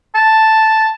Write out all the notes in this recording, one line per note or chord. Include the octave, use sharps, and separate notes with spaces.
A5